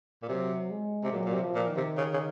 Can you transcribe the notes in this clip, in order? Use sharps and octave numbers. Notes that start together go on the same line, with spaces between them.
A#2
C3 F#3
G#3
C3
A#2 F#3
A#2
C3
F3
A#2
D#3
C3
C#3
C#3